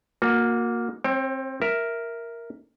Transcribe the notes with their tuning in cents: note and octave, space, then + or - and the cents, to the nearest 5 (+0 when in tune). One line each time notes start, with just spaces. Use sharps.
A#3 +0 F#4 -35
C4 +20 C#5 -35 G5 +15
A#4 +0 E5 +0